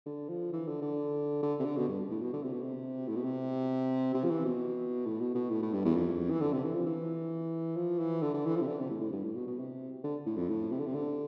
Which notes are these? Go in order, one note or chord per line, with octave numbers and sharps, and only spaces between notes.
D3
F3
E3
D3
D3
D3
C3
D3
B2
G2
A2
B2
D3
C3
B2
C3
A2
B2
C3
C3
F3
E3
B2
A2
B2
B2
A2
A2
G2
E2
F2
E3
D3
C3
E3
F3
E3
F3
E3
D3
D3
E3
F3
C3
D3
C3
A2
A2
G2
A2
B2
B2
C3
D3
A2
F2
A2
C3
D3
C3
D3